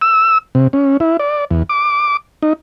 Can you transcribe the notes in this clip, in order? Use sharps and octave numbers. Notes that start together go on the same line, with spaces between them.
E6
C3
C#4
E4
D5
E2
D6
D#4